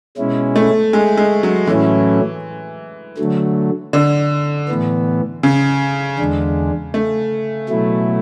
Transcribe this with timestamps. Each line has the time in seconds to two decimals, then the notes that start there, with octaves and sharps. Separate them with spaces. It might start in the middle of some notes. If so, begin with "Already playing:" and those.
0.17 B2 G#3 C#4 E4
0.56 A3
0.93 G#3
1.17 G#3
1.43 F#3
1.67 A2 E3 F#3 A3 C#4 E4
3.18 D3 F#3 A3
3.93 D3
4.69 A2 E3 B3
5.43 C#3
6.19 E2 D3 G#3 D4
6.94 A3
7.69 B2 F#3 A3 E4